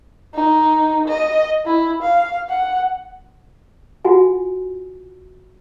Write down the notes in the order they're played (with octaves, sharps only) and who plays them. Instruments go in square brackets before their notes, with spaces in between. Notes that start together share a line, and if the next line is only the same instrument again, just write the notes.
[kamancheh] D#4
D#5
E4
F5
F#5
[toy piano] F4 F#4 F#5 G#5